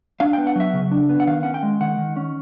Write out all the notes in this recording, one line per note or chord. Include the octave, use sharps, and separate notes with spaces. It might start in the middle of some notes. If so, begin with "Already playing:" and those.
D4 F5
G5
B3
F#5
F#3 E5
C#3
D4
B3
F#5
D#3 F5
C#4 F#5
G5
G#3
D#3 F#5
D#3
C#4